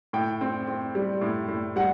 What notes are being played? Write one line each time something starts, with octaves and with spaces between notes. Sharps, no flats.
A2 G5
C4
C4
G3
A2
A2
G3 F#5